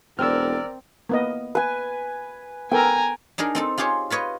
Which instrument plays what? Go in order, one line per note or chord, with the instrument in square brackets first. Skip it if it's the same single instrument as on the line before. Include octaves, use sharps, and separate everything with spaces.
[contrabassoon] E1 [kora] C4 [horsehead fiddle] A#4 D5 [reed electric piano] E6 F6
[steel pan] A#3 B3 D#5
[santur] B4 G#5
[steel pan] B3 A4 A#4 [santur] G5 [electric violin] G#5 A#5
[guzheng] D4 D#4 G#4 A#4
C4 D#4 A4
F4 G4 G#4 C5 C#5
F4 B4 C#5 D#5